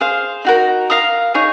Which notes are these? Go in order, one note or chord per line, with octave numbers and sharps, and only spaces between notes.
G#4 C5 F5
D#4 F#4 A#4
A#4 F5 A#5 D#6
D#4 G#4 C#5